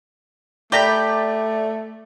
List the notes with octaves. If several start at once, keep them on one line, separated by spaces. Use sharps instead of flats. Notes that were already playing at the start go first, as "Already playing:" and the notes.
A3 G4 D5 G5 A#5 B5